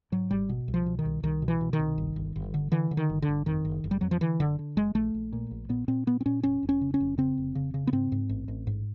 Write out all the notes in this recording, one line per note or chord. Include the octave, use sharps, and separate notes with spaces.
G#2 F#3
G#1 G3
B2
C2
F3
B2
D#3
C2
C2 D#3
B2
E3
B2
D#3
C2
G1
G1
G1
D3
D3 E3
D3
D#3
G1
D3
G1
F2 D#3
F#1
F#1
G3
F2 F#3
F3
D3 E3
F#1 D3
D3
F#1 G#3
A#1 A3
A#1
A#2
A#1
A#2 B3
A#2 C4
A#2 B3
C4
A#2 C#4
F1 C#4
F1
C#4
C#3
C#4
F1
C#3 C4
F1
C#3
C#3
B3
G#2 C4
G#2
A1
A1
G#2